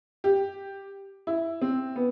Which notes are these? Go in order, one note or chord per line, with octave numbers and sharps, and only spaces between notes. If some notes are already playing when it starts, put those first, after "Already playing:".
G4
E4
C4
B3